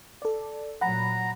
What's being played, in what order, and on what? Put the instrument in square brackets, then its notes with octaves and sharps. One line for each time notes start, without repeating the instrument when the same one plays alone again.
[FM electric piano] A4 D5
[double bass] A#2 F#3 [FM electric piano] F#5 B5 [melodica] A#5